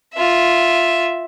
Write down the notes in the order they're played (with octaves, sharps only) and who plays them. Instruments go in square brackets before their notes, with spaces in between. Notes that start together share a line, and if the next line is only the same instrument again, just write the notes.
[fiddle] F4 E5